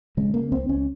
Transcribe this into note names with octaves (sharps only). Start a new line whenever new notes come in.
C#3 G#3
C#3 A#3
C#2 C4
C#2 C#4